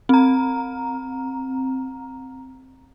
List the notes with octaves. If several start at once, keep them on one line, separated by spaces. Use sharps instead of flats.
C4 A#5